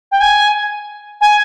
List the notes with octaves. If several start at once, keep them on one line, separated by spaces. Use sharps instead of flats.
G5
G#5
G#5